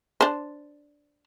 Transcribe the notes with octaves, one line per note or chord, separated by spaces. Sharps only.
D4 C5